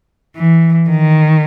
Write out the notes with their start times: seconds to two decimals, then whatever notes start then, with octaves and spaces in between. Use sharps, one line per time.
0.36 E3
0.90 D#3